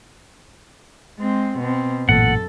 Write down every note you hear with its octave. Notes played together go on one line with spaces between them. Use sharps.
G#3 C4
B2 C4
A1 F#2 A#2 A4 F#5